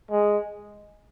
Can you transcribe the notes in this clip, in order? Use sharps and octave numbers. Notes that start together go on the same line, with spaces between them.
G#3